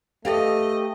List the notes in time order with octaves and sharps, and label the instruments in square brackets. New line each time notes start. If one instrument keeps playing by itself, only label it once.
[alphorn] A3 [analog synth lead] G4 [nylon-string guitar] A4 B4 F5 [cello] D#5